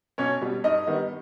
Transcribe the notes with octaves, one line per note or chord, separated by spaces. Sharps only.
B1 C#4 C#5
B2 G3
G2 D#4 D#5
D#3 G3 B3